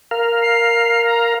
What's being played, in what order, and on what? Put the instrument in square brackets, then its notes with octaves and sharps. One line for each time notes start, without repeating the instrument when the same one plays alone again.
[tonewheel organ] A#4 F5
[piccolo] C7
A#5